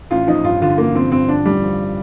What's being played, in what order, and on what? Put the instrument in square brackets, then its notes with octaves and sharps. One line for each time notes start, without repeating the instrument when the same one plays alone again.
[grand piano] A1 [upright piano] F4
[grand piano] F3 [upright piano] D#4
[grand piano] G2 [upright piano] F4
[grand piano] D3 [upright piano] F4
[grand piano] A1 [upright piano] A#3
[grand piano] F3 [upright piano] C4
[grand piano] G2 [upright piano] C4
[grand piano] D3 [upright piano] D4
[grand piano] A1 [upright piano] G3
[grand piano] F3